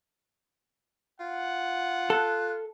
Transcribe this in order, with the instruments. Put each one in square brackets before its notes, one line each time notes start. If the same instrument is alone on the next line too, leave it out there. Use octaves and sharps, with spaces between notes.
[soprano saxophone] F4 [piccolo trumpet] F#5
[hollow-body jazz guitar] A4 [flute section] F#6